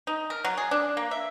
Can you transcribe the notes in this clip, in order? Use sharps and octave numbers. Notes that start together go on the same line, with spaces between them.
D#4
A#4
F#3
G#4
D4
A#3
E5